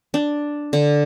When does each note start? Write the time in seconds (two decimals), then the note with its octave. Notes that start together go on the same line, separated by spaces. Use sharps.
0.14 D4
0.73 D3